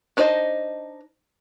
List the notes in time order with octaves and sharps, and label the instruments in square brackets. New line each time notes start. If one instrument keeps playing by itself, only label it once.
[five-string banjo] D4 D#4 C5 D5 D#5